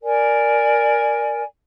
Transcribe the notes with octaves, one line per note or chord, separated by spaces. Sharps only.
A#4 D5 G#5